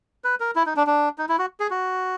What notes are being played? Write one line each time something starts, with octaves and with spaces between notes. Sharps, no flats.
B4
A#4
E4
D#4
D4
D4
D#4
E4
F#4
G#4
F#4